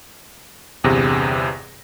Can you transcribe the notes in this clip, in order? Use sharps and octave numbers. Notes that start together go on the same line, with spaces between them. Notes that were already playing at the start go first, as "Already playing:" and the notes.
G1 E2 G2 C3 G#4 A#6